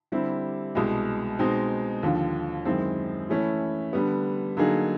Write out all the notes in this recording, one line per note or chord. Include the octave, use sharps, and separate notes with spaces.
D3 G3 C4 E4 G4
C2 B2 G#3
B2 G#3 C4 D#4
D#2 D3 F3
F#2 D#3 G#3 C4 E4
E3 A3 C#4 E4
D3 G3 B3
D3 F#3 A#3 D#4 G#4